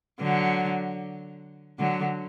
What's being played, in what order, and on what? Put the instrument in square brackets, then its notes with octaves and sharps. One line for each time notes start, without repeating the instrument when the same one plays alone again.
[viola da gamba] D3 F#3
D3 F#3